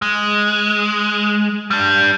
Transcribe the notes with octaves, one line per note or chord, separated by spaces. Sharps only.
G#3
G3 D4